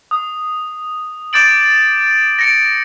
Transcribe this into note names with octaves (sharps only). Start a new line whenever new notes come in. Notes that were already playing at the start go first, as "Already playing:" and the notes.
D#6
D6 G6 A6 D7 F#7
A#6 C#7 D7